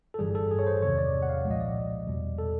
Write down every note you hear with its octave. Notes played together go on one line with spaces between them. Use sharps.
A4
G1 G2 E3 G3 G#4
A4
G#4
C#5
C5
E2 C3 D#3 F#3 C#5
D5
F#5
F5
C2 A#2 F3 G#3
D#5
D5
E2 B2 G3
A4